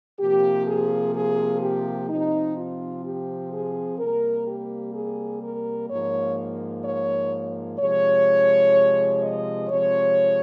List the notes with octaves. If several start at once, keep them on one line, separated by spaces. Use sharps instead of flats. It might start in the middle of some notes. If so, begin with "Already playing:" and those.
C3 F3 A#3 G4
G#4
G#4
G4
C3 F3 C4 D#4
F4
G4
G#4
C3 G3 A#3 A#4
G4
G#4
A#4
G#2 F3 A#3 C#5
C#5
C3 F3 G#3 C#5
D#5
C3 F3 G#3 C4 C#5